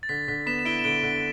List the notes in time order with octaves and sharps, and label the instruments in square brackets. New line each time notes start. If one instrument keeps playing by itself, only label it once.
[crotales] A6
[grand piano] D3 [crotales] B6
[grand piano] D3 [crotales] B6
[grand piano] B3 [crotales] B6 E7
[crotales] E7
[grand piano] E4 [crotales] D7 G7
[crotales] E7
[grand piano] D3 [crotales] D7 G7
[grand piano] D3